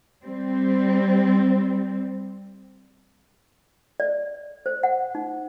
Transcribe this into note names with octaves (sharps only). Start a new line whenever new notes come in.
G3 C4
D5
C5
F#5
D#4